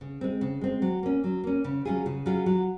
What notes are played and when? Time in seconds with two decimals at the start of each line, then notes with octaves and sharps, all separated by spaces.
0.01 C#3
0.21 G#3 C4
0.41 C#3
0.61 G#3 C4
0.82 F#3
1.03 A#3 C#4
1.24 F#3
1.44 A#3 C#4
1.64 C#3
1.85 F#3 C#4 F4 G#4
2.06 C#3
2.26 F#3 C#4 F4 G#4
2.46 F#3